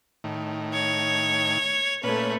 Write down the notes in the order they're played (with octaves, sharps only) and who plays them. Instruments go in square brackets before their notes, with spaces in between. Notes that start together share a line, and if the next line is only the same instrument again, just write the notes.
[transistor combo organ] A2 D#3
[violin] C#5
[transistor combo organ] A#2 C#4 [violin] A3 B4